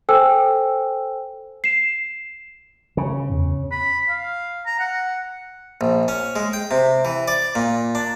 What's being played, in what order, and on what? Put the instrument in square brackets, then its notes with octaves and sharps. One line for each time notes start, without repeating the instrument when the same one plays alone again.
[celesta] A4 C5 G5 G#5 E6
C7 E7
[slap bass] C#3
[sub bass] E2
[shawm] B5
F5
A#5
F#5
[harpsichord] A#1
C#4
G#3
G5
C3
E3
D5
A#2
D4